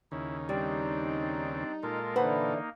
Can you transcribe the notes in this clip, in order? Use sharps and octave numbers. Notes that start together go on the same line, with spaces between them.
D#2 C#3 E4
G3 C4 D4 D#4 D5
A#2 G#3 F4 A4 A#4
D3 E3 A#3 D#4 B4 C5 F#5